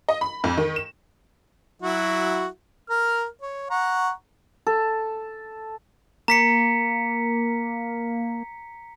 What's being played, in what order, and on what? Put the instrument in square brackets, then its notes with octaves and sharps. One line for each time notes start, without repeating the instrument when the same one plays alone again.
[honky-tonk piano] D#5
B5
F2
D#3
E7
[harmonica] F#3 E4 F#4
A#4 F6
C#5
F#5 A#5 C#6
[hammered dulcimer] A4
[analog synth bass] A#3 [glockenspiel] A#5 B6 C#7